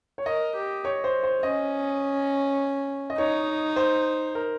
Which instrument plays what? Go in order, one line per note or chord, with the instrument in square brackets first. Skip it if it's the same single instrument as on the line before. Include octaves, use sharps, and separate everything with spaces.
[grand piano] C#5
[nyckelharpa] A#4 [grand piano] D#5
[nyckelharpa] G4
[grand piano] C#5
C5
C5
[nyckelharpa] C#4 [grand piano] D#5
[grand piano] D#5
[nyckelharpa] D#4 [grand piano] C#5
[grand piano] C5
A#4